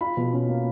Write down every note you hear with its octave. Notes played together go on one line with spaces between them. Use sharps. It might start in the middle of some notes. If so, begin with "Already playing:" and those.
F4 B5
B2
C#4
A#3